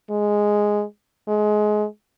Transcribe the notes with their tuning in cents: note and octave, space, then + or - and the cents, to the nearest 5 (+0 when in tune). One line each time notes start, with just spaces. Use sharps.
G#3 +0
G#3 +20